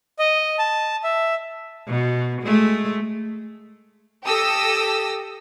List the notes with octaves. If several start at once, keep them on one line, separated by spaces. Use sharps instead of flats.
D#5
A5
E5
B2
G#3 A3
G4 A4 D#6 E6 A#6